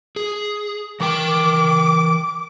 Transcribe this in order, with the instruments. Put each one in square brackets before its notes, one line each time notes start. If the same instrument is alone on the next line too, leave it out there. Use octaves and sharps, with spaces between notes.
[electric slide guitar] G#4
[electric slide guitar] E3 A#4 G5 [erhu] D6